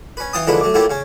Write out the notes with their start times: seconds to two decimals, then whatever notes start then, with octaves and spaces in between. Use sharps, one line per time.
0.17 C#4 B4
0.33 E3 F5 G5 A5 D#6
0.47 D3 F3 G#3 A#3 E4 B4
0.61 F#3 A3 D6
0.74 F#3 A3 A#3 E4 F4 G4
0.90 C#3 C#4